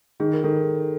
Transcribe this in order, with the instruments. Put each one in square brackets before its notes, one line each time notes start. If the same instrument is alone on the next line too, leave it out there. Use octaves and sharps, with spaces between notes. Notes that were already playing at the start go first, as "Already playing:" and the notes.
[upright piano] D#3 [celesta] G#4
[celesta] A#4
[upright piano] D#3 [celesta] A4